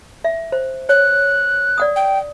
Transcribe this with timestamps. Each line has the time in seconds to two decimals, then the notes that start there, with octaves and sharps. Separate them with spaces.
0.24 E5
0.52 C5
0.89 C#5 F#6
1.78 D5 F#5 D#6
1.96 G5